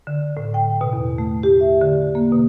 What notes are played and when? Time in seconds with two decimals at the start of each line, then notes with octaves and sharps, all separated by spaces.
0.07 D3
0.37 A2
0.54 G5
0.81 B2
0.93 E2
1.18 A3
1.43 G4
1.61 E5
1.81 D3
2.15 A#3
2.32 B2